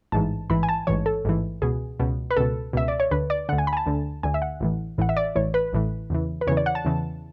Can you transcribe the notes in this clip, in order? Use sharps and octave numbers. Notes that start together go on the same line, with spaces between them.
A1 G#2 E3 A5
A1 G#2 E3 B5
G#5
A5
A1 G#2 E3 C#5
A4
A1 G#2 E3
C#2 B2 G#4
C#2 B2
B4
C#2 B2 A4
C#2 B2 E5
D5
C#5
D2 D3 B4
D5
D2 D3 F#5
G#5
B5
G#5
A5
D2 D3
D2 D3 G#5
E5
F#5
A1 A2 E3
A1 A2 E3 F#5
E5
D5
A1 A2 E3 C#5
B4
A1 A2 E3
E2 C#3 E3
B4
E2 C#3 E3 C#5
D5
F#5
A5
E2 C#3 E3